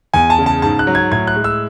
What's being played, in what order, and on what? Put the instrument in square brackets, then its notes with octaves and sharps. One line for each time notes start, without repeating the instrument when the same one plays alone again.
[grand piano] E2 G#5
A5
C#3
A5
G#2 A5
F#6
F#3
G#6
A2 G#6
F#6
G#3
E6